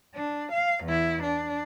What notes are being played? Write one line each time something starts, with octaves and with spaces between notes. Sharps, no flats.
D4
F5
E2 E4
D4